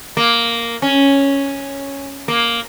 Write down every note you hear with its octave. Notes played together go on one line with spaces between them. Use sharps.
A#3
C#4
A#3